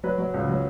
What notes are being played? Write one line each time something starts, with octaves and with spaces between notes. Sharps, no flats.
F#3 B4
F#3
C#2
F#3